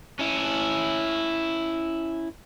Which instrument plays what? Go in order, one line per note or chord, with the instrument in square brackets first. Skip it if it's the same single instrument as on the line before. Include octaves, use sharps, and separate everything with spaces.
[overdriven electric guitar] C#4 E4